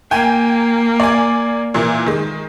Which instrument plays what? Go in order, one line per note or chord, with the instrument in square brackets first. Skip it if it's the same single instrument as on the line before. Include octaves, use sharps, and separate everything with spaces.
[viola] A#3 [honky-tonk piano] G5 G#5
[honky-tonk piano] D5 G#5
A#2 E3 A#3
D#3 G#3